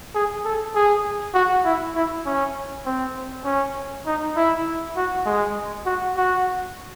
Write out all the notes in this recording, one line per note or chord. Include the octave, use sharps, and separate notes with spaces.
G#4
A4
G#4
F#4
E4
E4
C#4
C4
C#4
D#4
E4
F#4
G#3
F#4
F#4